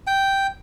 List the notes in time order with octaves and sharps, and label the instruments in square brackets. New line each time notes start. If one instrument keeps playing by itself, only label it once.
[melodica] G5